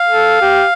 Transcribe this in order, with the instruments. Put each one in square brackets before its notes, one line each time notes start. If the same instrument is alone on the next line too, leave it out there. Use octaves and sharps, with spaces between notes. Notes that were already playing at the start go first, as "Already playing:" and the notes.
Already playing: [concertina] F5
[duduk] A4
G4